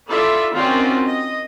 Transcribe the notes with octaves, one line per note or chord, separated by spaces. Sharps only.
E4 F4 A4 D5 E5
D#3 C4 C#4 F4 F#4 D5
D#5